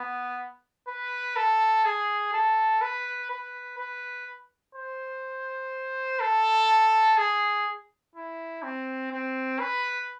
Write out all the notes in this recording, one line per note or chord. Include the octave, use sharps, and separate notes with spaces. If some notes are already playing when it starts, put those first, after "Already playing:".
Already playing: B3
B4
A4
G#4
A4
B4
B4
B4
C5
A4
G#4
E4
C4
C4
B4